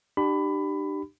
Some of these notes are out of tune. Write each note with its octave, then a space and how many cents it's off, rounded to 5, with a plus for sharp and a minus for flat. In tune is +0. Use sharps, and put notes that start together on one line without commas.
D4 +40 G4 -15 B5 +20